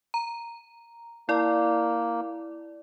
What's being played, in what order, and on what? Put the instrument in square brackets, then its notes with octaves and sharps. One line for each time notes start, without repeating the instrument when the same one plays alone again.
[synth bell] A#5
[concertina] A#3 [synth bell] E4 D5